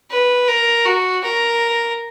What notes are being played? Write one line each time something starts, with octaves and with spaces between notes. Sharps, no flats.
B4
A#4
F#4
A#4